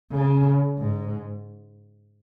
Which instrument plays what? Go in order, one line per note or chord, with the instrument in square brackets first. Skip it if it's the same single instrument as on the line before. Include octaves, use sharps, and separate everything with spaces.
[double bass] C#3
G#2